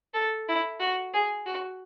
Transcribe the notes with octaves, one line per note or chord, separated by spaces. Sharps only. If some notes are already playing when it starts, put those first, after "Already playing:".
A4
E4
F#4
G#4
F#4